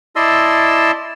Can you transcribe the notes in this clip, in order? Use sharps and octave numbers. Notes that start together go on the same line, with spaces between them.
E4 D5 D#5 A5 C6 E6